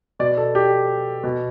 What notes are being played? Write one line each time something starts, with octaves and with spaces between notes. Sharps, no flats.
B2 D5
A4
G4
B2